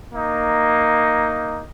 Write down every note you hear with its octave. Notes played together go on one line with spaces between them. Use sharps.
A#3 D#4